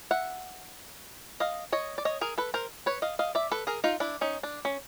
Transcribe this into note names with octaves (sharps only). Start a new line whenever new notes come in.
E5 F#5
D#5 F5
C#5 D#5
D5
C#5 D#5
G#4 A#4
A4 B4
A#4 C5
B4 C#5
D#5 F5
D#5 F5
D5 E5
A4 B4
G#4 A#4
D#4 F4
D4 E4
C#4 D#4
D4
C#4